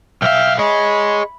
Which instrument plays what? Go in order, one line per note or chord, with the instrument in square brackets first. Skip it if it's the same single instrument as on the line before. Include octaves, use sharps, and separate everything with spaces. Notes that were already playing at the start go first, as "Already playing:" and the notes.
[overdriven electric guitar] B1 F5 [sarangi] E5 [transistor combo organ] G5 F6
[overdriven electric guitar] G#4 D#5 [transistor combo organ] C#5 [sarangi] B5